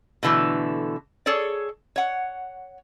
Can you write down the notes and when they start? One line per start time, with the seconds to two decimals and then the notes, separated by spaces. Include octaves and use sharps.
0.23 B2 D3 E3 A3
1.26 G#4 A4 C#5 D5
1.96 C#5 F#5